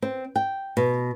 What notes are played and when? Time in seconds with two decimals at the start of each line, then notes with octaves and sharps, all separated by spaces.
0.02 C4
0.36 G5
0.77 B2